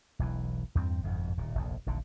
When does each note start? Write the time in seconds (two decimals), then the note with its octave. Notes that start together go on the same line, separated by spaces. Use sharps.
0.19 E1 B1 E3
0.75 E2 G2 C4
1.03 G1 F2 G#2 B2
1.37 D1 A#2
1.55 F1 A#1 D#2
1.86 D#1 A#1 A#2 D3